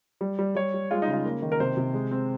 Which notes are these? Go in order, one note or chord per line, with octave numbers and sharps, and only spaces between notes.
G3
G3
G3 C#5
G3
G#3 F4
D#4
C#3
F4
A#3
D#3
A#4
C3 C5
C3
G#3
C4